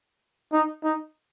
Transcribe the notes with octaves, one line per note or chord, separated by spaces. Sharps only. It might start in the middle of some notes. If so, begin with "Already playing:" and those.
D#4
D#4